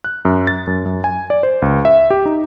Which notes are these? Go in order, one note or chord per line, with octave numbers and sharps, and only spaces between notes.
F#6
F#2
A6
F#2
F#2
G#5
D5
C5
C#2
E5
G4
D#4